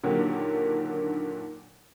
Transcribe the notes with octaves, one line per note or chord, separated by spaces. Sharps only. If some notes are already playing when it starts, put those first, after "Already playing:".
A#2 D3 D#3 F#3 A#3 G4